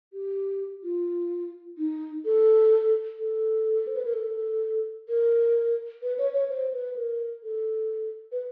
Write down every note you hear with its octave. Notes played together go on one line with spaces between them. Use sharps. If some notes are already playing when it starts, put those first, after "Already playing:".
G4
F4
D#4
A4
A4
C5
B4
A#4
A4
A#4
B4
C#5
C#5
C5
B4
A#4
A4
B4